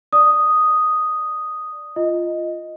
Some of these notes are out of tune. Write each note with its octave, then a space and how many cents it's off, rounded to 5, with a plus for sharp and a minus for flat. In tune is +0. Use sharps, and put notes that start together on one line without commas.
D5 +0 D#6 +0
F4 -10 D#5 +0